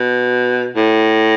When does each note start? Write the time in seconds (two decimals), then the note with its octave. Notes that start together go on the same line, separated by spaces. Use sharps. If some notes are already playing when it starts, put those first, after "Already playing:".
Already playing: B2
0.76 A2